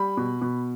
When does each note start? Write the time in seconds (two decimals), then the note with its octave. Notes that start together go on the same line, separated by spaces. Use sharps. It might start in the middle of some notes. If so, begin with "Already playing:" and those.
Already playing: G3 B5
0.17 B2
0.42 B2